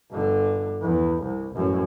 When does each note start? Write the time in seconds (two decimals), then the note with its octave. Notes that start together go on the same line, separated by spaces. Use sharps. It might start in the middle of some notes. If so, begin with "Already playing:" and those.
0.11 G1 D3
0.81 E2
1.22 C2
1.55 A1 F#2